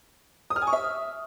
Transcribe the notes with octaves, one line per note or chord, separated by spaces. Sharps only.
D#6
F6
G#5
C#6
E5